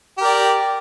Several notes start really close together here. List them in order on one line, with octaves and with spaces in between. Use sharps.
G4 A#4 D5